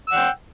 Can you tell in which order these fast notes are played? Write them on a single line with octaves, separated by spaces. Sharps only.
E6 F#5 G5